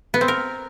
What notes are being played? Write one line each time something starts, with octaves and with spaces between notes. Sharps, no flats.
B3
C4
A#4